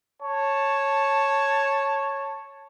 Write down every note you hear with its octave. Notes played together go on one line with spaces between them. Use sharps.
C#5 A5